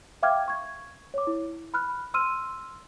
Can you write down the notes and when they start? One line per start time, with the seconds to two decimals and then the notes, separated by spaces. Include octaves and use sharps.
0.23 E5 F5 G5 D6 F6 G#6
0.48 C#6 G#6
1.14 C#5 D6
1.27 E4
1.74 B5 F6 F#6
2.14 C6 E6 F6 D#7